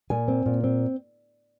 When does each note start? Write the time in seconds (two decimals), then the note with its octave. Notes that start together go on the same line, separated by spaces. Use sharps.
0.10 A#2 G#5
0.28 C4
0.46 A#2
0.64 C4